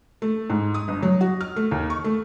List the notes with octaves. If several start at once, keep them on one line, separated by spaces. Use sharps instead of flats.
A3
G#2
D#6
G1
F#3
F#4
F6
A3
D#2
C#6
A3